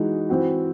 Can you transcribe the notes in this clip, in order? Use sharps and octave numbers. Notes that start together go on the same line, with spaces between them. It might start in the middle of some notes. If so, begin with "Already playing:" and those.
Already playing: E3 G#3 D#4 F#4
E3 C4 F#4